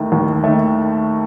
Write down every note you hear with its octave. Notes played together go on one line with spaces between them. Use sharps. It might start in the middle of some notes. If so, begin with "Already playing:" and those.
Already playing: D#2 D#3 A3
D#2
D#3 A3